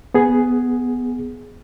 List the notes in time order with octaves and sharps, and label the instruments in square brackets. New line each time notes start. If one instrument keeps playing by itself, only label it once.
[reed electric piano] B3 G#4